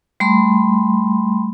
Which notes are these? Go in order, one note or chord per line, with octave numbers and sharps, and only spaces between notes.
G3 A3 B5 C6